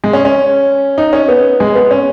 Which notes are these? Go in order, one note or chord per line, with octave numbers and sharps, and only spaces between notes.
G#3
C#4
C#4
D#4
C#4
B3
G#3
B3
C#4